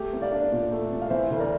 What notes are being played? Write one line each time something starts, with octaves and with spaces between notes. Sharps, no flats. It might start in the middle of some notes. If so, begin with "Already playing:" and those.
Already playing: A3 G4
C2
D5 F5
D4
A#2
A3
C2
F5
E3 C5 E5
D2
A#4 D5